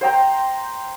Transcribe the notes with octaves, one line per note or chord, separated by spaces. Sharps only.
C5 G5 A#5